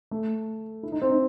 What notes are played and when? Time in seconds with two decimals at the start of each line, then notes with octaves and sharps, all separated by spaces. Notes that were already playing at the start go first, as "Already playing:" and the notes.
0.11 A3
0.83 E4
0.92 D#4
1.02 C4
1.10 D#4